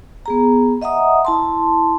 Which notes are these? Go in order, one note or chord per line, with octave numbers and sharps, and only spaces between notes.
B3 G#4 A#5
D#5 E5 F#5 A#5 D#6
E4 A5 C6